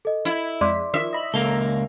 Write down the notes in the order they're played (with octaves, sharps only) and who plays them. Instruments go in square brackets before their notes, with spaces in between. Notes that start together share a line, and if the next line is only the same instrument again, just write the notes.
[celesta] A4 D#5
[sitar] E4
[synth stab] F2 G#3 B6 [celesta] D5 C6 D6
[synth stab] D#3 F3 [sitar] E5
[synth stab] D#5 B5
[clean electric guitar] C#2 A#3 [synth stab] A4 A#5 [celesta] G7